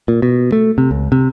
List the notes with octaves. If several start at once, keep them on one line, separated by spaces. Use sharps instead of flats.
A#2
B2
A3
C3
C#2
C3